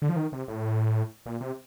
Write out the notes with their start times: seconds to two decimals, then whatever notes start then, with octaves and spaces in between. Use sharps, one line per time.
0.02 D3
0.09 F3
0.16 D#3
0.33 C3
0.48 A2
1.26 A#2
1.41 C3